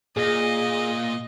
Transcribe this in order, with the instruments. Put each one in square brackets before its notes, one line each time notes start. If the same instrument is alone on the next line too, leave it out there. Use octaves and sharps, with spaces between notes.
[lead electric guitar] A#2 [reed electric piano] G#4 [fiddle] D#5